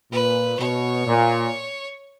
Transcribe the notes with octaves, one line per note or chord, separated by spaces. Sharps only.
A#2 B4
B2 C#5
A#2